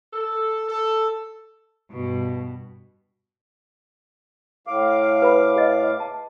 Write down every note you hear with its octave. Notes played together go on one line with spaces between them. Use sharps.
A4
A4
G2 B2
A2 F5 D6
B4 B5
G#4 D#5
A5